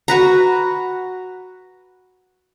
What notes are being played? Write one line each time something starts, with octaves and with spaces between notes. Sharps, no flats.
F#4 B4 A#5